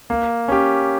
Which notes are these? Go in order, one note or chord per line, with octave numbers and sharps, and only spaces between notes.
A#3
C#4 G4